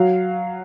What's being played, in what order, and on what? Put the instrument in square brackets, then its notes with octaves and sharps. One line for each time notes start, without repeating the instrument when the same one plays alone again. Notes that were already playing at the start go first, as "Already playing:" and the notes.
Already playing: [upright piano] F#3 F5